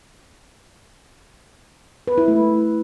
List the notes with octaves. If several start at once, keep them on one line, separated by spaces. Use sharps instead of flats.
B4
E4
A3